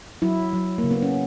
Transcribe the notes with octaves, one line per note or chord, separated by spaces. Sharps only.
F#3 E4
F#3
A#3
C#3
B3
C#4